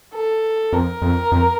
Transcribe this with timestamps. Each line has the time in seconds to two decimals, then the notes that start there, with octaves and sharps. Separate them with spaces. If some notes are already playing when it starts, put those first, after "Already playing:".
0.14 A4
0.73 F2 A#4
1.02 F2
1.32 F2